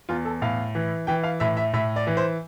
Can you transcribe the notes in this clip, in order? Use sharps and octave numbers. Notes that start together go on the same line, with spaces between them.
E2 F4
A4
A2 F5
E3
E3 G5
F5
A2 E5
E5
A2 E5
D5
E3
C5